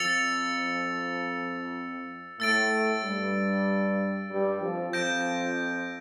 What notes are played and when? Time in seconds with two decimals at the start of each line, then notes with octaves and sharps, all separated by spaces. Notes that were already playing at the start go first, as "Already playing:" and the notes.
Already playing: F2 F3 E6 A6 C#7 F7
2.40 A2 A3 E6 A6 D7
3.03 G2 G3
4.30 G2 G3
4.61 F2 F3
4.93 F2 F3 G6 A#6 D7